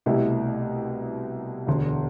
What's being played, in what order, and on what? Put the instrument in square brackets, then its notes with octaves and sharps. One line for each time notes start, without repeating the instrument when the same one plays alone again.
[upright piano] C2 B2 A3 E4 G4
E1 D2 D3